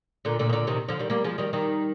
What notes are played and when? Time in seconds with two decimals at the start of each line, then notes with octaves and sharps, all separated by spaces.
0.25 A#2 D3
0.39 A#2 D3
0.49 D#3
0.53 A#2 D3
0.67 C3 D#3
0.88 D3 F3
0.99 D#3 G3
1.10 G3 A#3
1.24 F3 G#3
1.38 D#3 G3
1.53 D#3 G3